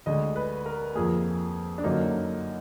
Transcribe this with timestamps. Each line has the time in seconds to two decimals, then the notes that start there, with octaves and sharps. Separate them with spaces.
0.06 D2 D3 G#3 D#5
0.36 B4
0.66 A#4
0.95 F2 F3 A#3 G#4
1.78 D4
1.84 F#2 D3 F#3 A#3 D#4